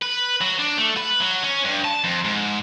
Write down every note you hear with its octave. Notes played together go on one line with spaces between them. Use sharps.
B4
F#3
D4
A3
B4
F#3
C#4
G2
A5
F2
G#2